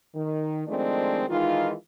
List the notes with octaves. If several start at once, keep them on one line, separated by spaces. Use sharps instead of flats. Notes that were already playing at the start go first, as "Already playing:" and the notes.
D#3
D#3 F3 G#3 A3 C4 D4
D#3 E3 G#3 D#4 F4